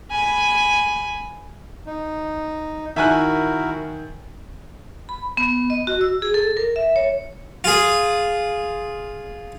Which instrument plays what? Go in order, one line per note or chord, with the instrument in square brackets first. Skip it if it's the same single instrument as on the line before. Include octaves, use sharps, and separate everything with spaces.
[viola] G#5 B5
[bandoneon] D#4
[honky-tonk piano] D#3 [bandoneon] E4 F#4 A#4 [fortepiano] E5 G#5 F#6
[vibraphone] B5
B3
D#5
F#4
E6
G#4
A4
A#4
E5
C#5
[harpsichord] F4 G#4